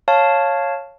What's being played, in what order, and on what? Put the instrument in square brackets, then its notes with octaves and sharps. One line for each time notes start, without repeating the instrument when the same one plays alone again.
[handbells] C#5 F5 A5